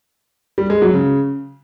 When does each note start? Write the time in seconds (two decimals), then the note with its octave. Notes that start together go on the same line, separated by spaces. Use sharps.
0.58 G3
0.70 G#3
0.82 F#3
0.94 C#3